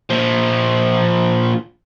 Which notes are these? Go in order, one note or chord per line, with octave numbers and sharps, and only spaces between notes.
A#2 F3